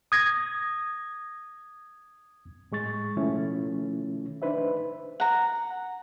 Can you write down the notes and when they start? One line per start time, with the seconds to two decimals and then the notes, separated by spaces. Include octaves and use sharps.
0.12 D#6 G#6 A#6
2.72 A2 G#3 C#6 A6
3.16 B2 D#3 F3 A3 C#4 E4
4.42 D4 D#4 B4 C5 E5
5.20 F#5 A#5